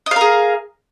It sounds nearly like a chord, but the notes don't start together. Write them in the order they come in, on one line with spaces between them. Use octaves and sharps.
D#5 F5 A#4 G#4